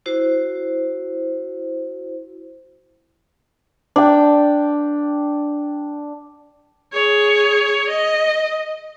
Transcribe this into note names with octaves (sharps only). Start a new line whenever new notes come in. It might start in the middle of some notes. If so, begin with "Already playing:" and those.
E4 F#4 C5
D4 G5
G#4 C#5
D#5